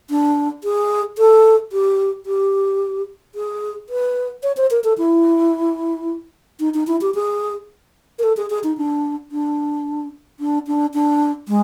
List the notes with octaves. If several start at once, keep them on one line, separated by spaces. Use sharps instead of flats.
D4
G#4
A4
G4
G4
G#4
B4
C#5
C5
A#4
A4
E4
D#4
D#4
E4
G4
G#4
A#4
A4
G#4
G#4
D#4
D4
D4
D4
D4
D4
G#3